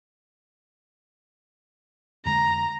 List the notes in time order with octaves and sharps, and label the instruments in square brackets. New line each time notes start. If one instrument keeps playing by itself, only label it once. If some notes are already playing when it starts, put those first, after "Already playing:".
[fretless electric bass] F2 D3 G#3 [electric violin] A#5